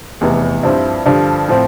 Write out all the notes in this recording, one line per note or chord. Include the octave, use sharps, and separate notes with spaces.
F1 E2 E3
G2 F3 C4 E4
G2 D3 F3
A2 F3 C4